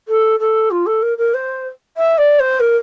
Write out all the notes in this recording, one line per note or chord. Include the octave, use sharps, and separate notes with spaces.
A4
A4
F4
A4
A#4
A#4
C5
E5
D5
C5
A#4